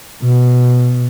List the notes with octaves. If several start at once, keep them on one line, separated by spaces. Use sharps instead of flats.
B2